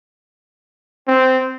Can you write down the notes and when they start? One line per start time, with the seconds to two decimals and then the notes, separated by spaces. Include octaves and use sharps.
1.07 C4